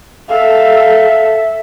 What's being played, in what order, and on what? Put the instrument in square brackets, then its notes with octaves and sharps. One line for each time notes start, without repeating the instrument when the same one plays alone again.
[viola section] A4 [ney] E5 [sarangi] F5